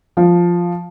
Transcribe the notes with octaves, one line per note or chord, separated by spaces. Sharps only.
F3